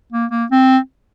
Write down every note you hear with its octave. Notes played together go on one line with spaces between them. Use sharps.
A#3
A#3
C4